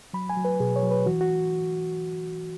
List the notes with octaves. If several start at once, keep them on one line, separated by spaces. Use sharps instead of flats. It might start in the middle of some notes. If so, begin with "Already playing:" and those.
F#3 B5
G#5
F#3
B4
B2 G#4
C#5
F#3
B4
E3 F#4
F#4